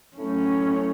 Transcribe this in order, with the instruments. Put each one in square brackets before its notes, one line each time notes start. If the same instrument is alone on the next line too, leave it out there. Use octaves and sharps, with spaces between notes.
[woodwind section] A2 F#3 A3 [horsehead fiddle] C#4